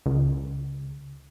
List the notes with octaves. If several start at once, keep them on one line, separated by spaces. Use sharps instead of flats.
C#2